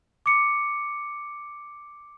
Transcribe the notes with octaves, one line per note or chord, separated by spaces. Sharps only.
D6 C#7